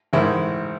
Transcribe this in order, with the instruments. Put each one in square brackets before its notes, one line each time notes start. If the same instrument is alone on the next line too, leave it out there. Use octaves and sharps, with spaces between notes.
[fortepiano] A1 G#2 D#3 E4